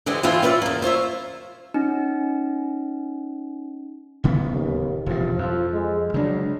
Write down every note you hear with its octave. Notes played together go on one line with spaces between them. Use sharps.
D3 E3 G#3 C4 G4
E3 F3 A3 C4 E4 F4
C#4 F4 B4 C5 D5 E5
E2 A#3
F4 C5 C#5 E5
C#4 D#4
D1 C#3 B3
D#2
E1 G2 C3 F3
F2 F3
G#3
C#3 F#3 G#3 D4